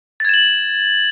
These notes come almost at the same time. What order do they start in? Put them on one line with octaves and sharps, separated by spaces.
A6 G#6 E7 F#7